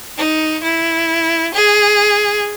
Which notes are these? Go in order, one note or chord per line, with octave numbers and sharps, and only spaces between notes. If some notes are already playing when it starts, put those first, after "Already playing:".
D#4
E4
G#4